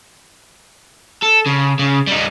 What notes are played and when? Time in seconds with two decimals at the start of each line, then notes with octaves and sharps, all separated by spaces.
1.22 A4
1.46 C#3
1.79 C#3
2.07 G3 D#4